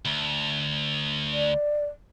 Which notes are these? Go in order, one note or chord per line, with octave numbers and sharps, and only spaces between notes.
D2
D5